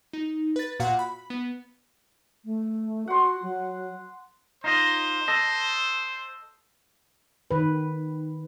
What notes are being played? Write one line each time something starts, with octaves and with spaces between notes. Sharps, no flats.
D#4
B4 A6
A#2 F#4 F5 F#5 F#6
B5
B3
A3
F#4 F#5 C6
F#3
D#4 F4 C5 D#5
A4 D#5
D#3 B4